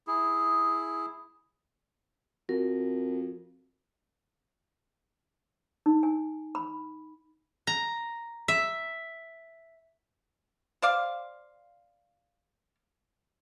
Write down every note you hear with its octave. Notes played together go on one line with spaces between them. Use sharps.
E4 G#4
F2 F#4 A#4
D#4
G#5
B5
A#5
E5
C5 D5 F5